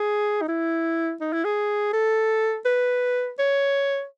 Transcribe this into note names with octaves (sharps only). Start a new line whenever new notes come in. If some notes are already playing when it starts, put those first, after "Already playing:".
Already playing: G#4
D#4
E4
D#4
E4
G#4
A4
B4
C#5